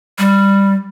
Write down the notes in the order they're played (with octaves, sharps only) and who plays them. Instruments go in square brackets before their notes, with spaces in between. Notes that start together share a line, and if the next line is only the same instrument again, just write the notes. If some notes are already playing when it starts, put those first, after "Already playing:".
[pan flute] G3